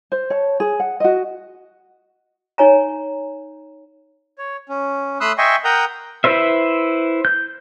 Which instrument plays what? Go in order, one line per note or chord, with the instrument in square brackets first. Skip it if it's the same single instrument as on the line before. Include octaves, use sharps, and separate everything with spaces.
[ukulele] C5
C#5 A5
G#4
F#5
F#4 D#5
[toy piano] D#4 C#5 G#5 A#5
[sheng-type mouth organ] C#5
C#4
A3 B5 C6 D#6 E6 F#6
D#5 E5 G5 G#5 C6 C#6
A#4 F#5 G5 A#5 D#6 G6
[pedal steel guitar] E4 B4 C5 E5
G6